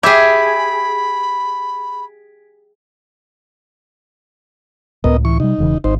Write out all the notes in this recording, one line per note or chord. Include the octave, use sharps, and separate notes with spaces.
G4 G#4 E5 B5 G#6 B6 D7
C#2 A2 B3 A#4 D#5
E3 C#6
C3 G3 D#4
E1 C#3 E3
G#1 D#4 C5